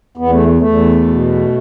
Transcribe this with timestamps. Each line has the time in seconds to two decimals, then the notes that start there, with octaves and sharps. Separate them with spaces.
0.17 E2 B3
0.31 A3
0.58 E2 A3
1.07 B2